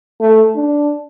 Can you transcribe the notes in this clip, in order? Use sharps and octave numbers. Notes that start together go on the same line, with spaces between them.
A3
D4